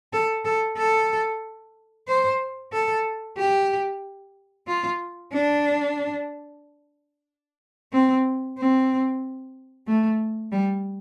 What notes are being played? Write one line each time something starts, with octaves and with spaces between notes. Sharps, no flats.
A4
A4
A4
C5
A4
G4
F4
D4
C4
C4
A3
G3